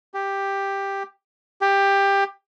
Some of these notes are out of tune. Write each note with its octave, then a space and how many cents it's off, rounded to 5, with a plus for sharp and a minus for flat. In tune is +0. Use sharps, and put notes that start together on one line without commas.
G4 +5
G4 +15